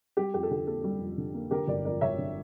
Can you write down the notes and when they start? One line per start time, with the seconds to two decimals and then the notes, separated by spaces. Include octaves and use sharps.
0.17 G3 G4
0.34 F2 G4
0.43 A4
0.51 D3 G4
0.67 A#3 A4
0.84 G3
1.00 F2
1.18 D3
1.34 A#3
1.51 D3 G4 A#4
1.67 G1 A#4 D5
1.85 F2 A#4 D5
2.01 G1 C#5 E5
2.18 D3